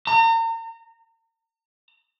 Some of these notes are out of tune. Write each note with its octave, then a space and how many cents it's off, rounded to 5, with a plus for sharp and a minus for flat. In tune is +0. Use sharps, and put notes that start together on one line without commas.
A#5 -40